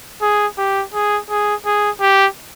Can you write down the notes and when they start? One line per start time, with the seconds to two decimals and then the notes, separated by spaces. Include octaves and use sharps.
0.22 G#4
0.58 G4
0.94 G#4
1.30 G#4
1.65 G#4
2.01 G4